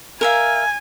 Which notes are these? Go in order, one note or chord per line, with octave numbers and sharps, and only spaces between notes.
A#4 E5 F5 G#5